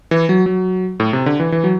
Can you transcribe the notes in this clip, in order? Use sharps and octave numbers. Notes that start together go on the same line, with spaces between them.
E3
F#3
F#3
A2
C3
D3
E3
E3
F#3